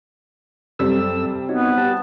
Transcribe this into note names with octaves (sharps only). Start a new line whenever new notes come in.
F#2 C3 G3 C4 A4 E6
B3 D#4 F#4 C#5
G4 B4 A5